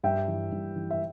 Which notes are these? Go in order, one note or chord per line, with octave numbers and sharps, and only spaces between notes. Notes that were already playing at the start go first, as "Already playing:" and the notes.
G2 E5 G5
E3
G2
E3
E5